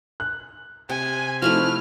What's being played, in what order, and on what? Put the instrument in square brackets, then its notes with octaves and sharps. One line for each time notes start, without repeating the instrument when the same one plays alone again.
[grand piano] F#6
[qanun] C3 [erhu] G#5
[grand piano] F3 C4 D#4 [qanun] A3 E4 F#4 [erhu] F6